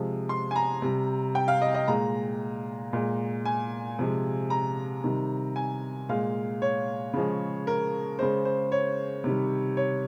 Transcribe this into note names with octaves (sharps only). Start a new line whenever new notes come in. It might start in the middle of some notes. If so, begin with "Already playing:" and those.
Already playing: C3 F3 G#3
C6
G#5
A#5
C3 G3
G5
F5
D#5
D#5
A#2 G#3 A#5
A#2 G#3
G#5
C3 F3 G#3
A#5
C3 D#3 G3
G#5
A#2 G#3 F5
C#5
C#3 F3 G#3
A#4
C#3 G#3 C5
C5
C#5
C3 D#3 G3
C#5